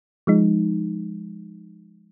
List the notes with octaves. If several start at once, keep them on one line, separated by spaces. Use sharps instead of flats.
F3 G#3 D#4